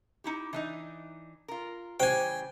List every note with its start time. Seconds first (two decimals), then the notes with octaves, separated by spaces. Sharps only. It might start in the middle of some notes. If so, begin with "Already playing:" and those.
0.24 D#4 E4 G4
0.53 E3 D4 D#4
1.48 F4 A#4
2.00 C#3 E3 G3 G4 C5 C#5 G5 G#5